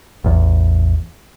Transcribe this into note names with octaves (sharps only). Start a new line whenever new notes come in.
A1 E2